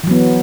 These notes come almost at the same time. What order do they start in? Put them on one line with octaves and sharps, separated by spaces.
E3 F#3 B3